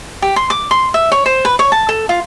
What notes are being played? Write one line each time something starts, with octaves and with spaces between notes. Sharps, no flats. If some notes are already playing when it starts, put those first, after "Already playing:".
G4
C6
D6
C6
E5
C#5
C5
B4
C#5
A5
A4
F4